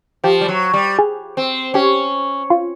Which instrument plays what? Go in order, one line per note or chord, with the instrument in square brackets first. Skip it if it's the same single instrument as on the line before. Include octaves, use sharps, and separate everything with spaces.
[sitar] F3 [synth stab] G4
[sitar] G3
F#3
G3
[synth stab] G#4
[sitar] C4
[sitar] C#4 [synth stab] G4
[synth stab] F4